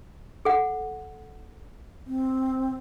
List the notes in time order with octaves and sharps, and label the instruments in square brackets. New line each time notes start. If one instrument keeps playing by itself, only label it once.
[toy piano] A4 F#5
[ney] C4